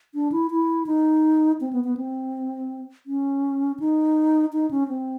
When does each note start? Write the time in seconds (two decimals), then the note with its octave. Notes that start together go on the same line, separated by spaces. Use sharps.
0.14 D4
0.32 E4
0.51 E4
0.87 D#4
1.61 C4
1.73 B3
1.84 B3
1.97 C4
3.06 C#4
3.80 D#4
4.53 D#4
4.71 C#4
4.88 C4